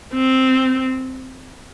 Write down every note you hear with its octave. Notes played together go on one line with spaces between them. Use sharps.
C4